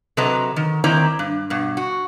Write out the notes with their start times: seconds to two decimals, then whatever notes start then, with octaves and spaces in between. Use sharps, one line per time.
0.17 C3 F#3 A4 B4 D#5 A#5
0.56 D#3
0.84 D#3 A#3 C4 E4 D5 A#5
1.19 G2
1.50 G2 B2
1.77 F#4